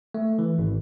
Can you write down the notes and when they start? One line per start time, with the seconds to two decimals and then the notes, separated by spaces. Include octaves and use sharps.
0.14 A3
0.39 E3
0.59 G#1